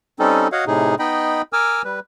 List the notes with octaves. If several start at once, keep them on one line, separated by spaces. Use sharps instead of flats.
G3 C4 C#4 D#4 A4
F#4 C#5 D#5 F5 F#5
A2 C3 D#4 G#4
B3 D#4 D#5 G5 B5
A#4 G#5 D6 E6 F6
G3 B4